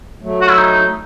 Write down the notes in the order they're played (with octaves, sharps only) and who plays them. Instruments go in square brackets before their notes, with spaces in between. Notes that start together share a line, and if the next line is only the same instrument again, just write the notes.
[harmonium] F#3 A3
[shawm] F#4
E4
D#4